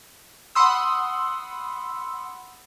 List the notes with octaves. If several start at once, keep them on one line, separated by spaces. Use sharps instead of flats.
F#5 B5 C6 D#6 E6